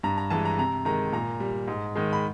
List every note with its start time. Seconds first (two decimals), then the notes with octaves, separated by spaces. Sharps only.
0.03 G2 A#5
0.18 A#5
0.30 E3 G#3 A5
0.45 A#5
0.58 C3 A#5
0.85 D#3 G#3 A#5
1.13 A#2 A#5
1.40 G3
1.68 G#2
1.95 D#3 G#3
2.13 B5